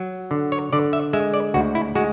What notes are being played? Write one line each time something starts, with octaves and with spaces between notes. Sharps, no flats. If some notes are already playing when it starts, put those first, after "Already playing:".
Already playing: F#3
D3
C#5
D3 D5
E5
G#3 E5
D5
D2 F#4
E4
G#3 F#4